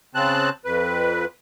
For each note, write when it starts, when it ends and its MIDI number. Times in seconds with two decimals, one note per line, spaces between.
0.15 0.49 49
0.15 0.49 60
0.15 0.49 81
0.15 0.49 90
0.65 1.25 41
0.65 1.25 71